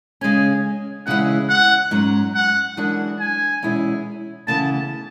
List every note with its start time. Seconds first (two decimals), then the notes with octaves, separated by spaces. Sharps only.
0.21 C#3 G#3 C#4 G#5
1.06 E2 C#3 G#3 C#4 E4 F#5
1.49 F#5
1.91 G#2 F#3 C#4
2.35 F#5
2.77 F#2 E3 G#3 D4 F#4
3.20 G#5
3.62 E2 B2 G#3 C#4 E4
4.47 D2 C#3 E3 B3 A5